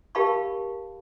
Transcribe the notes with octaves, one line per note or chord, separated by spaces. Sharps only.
G4 A#4 F5 A5 B5 C#6